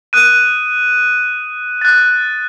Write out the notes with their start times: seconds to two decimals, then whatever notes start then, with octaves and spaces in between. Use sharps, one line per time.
0.13 D#6 F#6 D#7
1.81 F#6 A6